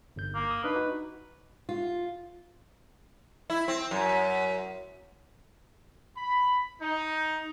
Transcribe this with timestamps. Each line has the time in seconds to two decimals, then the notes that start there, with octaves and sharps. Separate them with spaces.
0.16 G1 G6
0.35 A#3
0.51 D#6
0.64 D4 D#4 B4
0.76 D#4 F#4
1.69 F4
3.50 E4
3.68 C4
3.91 F#2
6.17 B5
6.81 D#4